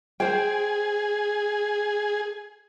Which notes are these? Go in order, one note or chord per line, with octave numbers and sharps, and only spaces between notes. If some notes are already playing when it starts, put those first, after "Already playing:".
G#4 C5 G5